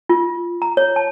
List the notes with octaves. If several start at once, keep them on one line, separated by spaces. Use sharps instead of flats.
F4
A#5
C#5
A5